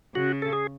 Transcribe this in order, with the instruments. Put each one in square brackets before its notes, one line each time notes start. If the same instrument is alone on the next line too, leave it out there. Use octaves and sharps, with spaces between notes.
[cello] C#3 [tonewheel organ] F#4
[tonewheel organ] A4
G#4